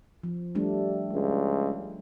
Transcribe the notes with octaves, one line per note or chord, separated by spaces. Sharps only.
F3
G3 A3 D4
C#2